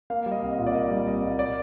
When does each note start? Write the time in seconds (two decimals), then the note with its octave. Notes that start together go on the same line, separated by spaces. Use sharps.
0.10 A#3 F5
0.26 G3
0.31 D#5
0.42 C2
0.53 D#5
0.58 A#2
0.67 D5
0.74 A#3 D#5
0.90 G3
1.07 C2 D#5
1.23 A#2
1.39 D5